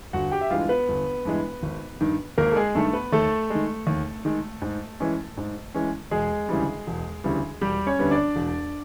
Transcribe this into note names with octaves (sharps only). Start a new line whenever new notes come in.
G1 F#4 F#5
G4 G5
E5
G2 E3 G#3 F4 F5
B3 B4
G1
G2 E3 G#3
G#1
G2 D#3
G#1 A#3 A#4
A4
G#3 G#4
G2 D#3 A3 A4
B3 B4
D#2 A3 A4
D#3 G#3
D#2
D#3 G#3
G#2
E3 G#3 C#4
G#2
E3 G#3 C#4
E1 G#3 G#4
D2 C#3 E3 G3
E1
D2 C#3 E3 G3
E1 G3 G4
C#4 C#5
D2 D3 G3 B3
D4 D5
E1